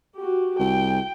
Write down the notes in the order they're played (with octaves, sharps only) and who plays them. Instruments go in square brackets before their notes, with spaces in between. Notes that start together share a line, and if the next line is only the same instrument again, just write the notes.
[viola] F#4 G4
[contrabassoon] C2 [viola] G5